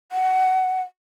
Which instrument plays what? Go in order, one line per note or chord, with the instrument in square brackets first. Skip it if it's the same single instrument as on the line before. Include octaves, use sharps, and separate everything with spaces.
[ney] F#5